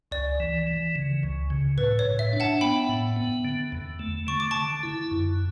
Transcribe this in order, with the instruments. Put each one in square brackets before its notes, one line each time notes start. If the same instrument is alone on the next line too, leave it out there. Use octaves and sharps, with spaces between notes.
[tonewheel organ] C#2 [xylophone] D5
[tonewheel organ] E3
E3
C#3
C#2
C#3
[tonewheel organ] A2 [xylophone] B4
[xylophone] C#5
[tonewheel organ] A2
[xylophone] E5
[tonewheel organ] D4
[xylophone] F#5 A5
[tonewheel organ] B3 [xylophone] G5 B5
[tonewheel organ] A2
B3
D3
E2
A3
[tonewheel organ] D3 [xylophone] C#6
[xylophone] D6
[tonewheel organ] D3 [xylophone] A5 C#6
[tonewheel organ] E4
F#2